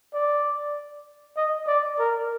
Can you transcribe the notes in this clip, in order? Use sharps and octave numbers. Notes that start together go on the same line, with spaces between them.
D5
D#5
D5
A#4